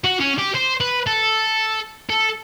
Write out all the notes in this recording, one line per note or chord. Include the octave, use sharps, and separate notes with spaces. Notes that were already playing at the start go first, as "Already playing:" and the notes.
F#4
C#4
G4
C5
B4
A4
A4